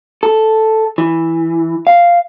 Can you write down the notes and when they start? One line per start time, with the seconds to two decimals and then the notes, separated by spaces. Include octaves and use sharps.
0.23 A4
0.98 E3
1.87 F5